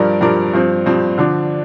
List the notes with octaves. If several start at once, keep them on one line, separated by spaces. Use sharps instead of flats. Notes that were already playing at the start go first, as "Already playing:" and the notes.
Already playing: G2 F3 D4 A#4 D5
G2 F3 D4 A#4 D5
G2 F3 C4
G2 F3 C4
D3 F3 D4